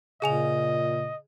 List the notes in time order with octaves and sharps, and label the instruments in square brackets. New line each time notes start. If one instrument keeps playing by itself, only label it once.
[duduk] A#2 [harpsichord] C#3 [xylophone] G#4 G#5 F7 [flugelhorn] D#5